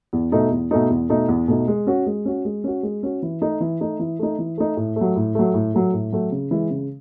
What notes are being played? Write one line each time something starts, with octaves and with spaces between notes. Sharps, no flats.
E2
B2 A3 D#4
E2
B2 A3 D#4
E2
B2 A3 D#4
E2
B2 A3 D#4
G#3
C#4 F#4
G#3
C#4 F#4
G#3
C#4 F#4
G#3
C#4 F#4
E3
A3 D#4
E3
A3 D#4
E3
A3 D#4
E3
A3 D#4
A2
A3
F#3
A2
F#3 A3
A2
F#3 A3
A2
F#3 A3
C#3
E3 G#3
C#3